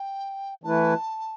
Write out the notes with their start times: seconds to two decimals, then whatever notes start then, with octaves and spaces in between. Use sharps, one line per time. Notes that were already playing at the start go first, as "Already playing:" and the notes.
Already playing: G5
0.64 E3 A3 E4 B4 A5